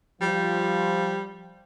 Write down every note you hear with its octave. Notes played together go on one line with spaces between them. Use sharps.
F3 G3